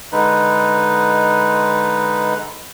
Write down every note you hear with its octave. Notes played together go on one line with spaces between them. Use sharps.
D3 G#3 D#4 B4